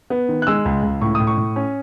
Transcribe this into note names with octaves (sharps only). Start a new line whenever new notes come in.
B3
D#3
F#6
G#3 E6
C#2
C#2
A2 C#6
D#6
A2
C#6
A2
C#4